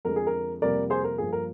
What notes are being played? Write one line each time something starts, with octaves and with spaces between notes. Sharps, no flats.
F2 D3 G#3 A#4
G#4
A#4
F2 C3 G3 A#3 A#4 D5
G#4 C5
A#4
G2 F3 A#3 G#4
A#4